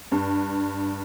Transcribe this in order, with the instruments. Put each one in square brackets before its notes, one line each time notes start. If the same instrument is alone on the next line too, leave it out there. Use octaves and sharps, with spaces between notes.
[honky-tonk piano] G2